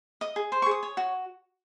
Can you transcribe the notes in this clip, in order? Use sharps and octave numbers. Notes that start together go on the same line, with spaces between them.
D#5 D#6
G#4
C5
C#6
G#4
D#6
C#5
F#4